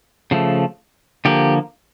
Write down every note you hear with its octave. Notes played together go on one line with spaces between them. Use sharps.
C#3 F3 A3
D3 F3 A#3 G4